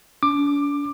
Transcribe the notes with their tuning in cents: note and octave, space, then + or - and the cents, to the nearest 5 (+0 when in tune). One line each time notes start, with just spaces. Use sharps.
D4 -45 D6 +15